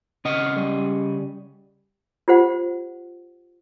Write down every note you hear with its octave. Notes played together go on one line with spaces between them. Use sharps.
C#3 D#5 F#5 F6
G3
F4 G4 C5 F#5